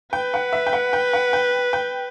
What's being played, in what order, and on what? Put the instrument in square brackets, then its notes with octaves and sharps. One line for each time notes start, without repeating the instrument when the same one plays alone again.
[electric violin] B4 [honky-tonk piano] G5
[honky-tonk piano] F#5
E5
G5
F#5
G5
F#5
G5
G5